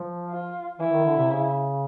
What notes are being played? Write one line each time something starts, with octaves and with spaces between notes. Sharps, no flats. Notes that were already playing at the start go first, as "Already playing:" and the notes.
Already playing: F3
F4
E3 E4
D#3
D3
C3
C#3